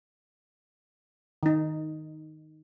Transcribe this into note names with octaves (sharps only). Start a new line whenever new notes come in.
D#3 D#4